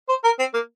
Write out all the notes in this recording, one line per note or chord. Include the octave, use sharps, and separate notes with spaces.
C5
A#4
C4
A#3